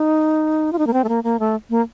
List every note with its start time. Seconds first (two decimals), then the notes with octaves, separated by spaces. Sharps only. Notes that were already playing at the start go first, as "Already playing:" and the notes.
Already playing: D#4
0.73 F4
0.79 D#4
0.87 A#3
0.93 C4
1.04 A3
1.09 A#3
1.24 A#3
1.40 A3
1.70 A#3